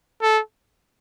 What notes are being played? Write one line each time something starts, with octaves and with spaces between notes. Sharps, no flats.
A4